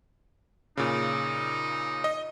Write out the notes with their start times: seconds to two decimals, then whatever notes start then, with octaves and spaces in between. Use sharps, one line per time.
0.77 A#2 C#3 D#4
2.04 D#5